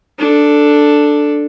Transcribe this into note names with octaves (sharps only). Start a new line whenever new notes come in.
D4 A4